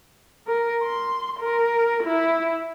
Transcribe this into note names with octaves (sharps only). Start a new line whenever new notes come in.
A#4
C6
A#4
E4